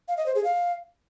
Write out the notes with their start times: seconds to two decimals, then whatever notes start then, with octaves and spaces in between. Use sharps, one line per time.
0.08 F5
0.17 D#5
0.26 C5
0.35 G#4
0.44 F5